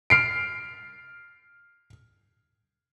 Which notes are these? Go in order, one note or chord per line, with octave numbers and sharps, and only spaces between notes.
F6 C7 D7